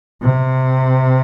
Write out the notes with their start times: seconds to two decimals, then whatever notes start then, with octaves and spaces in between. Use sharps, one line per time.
0.22 C3